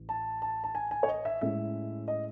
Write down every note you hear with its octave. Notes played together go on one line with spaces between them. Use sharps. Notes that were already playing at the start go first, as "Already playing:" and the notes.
Already playing: A1
A5
A5
A5
G#5
G#5
C#5
D#5
E5
A2 G#3 C#4 E4 E5
D#5